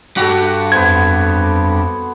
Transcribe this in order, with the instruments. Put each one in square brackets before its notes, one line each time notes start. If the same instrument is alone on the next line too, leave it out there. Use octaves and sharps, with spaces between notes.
[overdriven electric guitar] G2 G3 [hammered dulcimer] F#4 A4
[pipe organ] F2 [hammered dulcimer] B3 C5 [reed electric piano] G#6